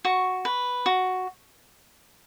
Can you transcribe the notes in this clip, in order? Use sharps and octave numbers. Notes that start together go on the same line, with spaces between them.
F#4 C#6
B4
F#4